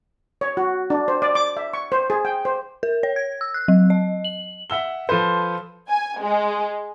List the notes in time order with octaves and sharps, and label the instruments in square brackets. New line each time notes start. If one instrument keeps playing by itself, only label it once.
[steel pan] C#5
F#4
D4
C5
D5
D6
E5
C#6
C5
G#4
G5
C5
[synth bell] A#4
C#5
G#6
E6
F#6
F#3
D#5
F#7
[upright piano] E5 F#5 E6 G7
F3 A4 B4 C5
[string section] G#5
G#3